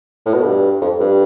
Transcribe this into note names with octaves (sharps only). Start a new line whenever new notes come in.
A2
B2
G2
F2
G2